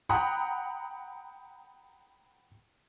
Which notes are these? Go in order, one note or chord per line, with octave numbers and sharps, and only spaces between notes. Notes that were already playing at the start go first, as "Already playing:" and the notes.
F#5 G5 A#5 B5 D#6